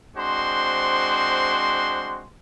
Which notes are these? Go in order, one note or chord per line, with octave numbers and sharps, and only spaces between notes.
G#3 C4 D4 F#4 C5 C6